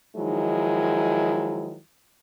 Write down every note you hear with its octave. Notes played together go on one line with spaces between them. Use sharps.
D#3 F3 F#3 G#3 D#4 E4